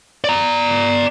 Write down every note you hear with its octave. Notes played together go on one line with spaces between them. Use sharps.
D5 A#5